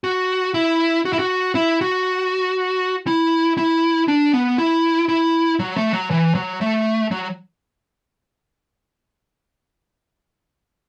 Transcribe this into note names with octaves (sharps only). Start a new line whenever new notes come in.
F#4
E4
F#4
E4
F#4
E4
F#4
E4
E4
D4
B3
E4
E4
F#3
A3
F#3
E3
F#3
A3
F#3